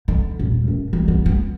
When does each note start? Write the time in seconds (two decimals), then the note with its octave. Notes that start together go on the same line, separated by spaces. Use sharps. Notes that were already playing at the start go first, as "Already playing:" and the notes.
0.08 D3
0.39 D#1
0.68 F#2
0.93 E3
1.08 B3
1.26 B3